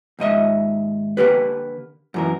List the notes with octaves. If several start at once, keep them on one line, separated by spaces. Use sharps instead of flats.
D#2 G#2 D#5 E5
D3 A#3 G4 B4
F#2 E3 A#4